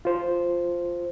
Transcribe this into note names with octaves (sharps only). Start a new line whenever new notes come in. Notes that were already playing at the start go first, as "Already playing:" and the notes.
F4 C5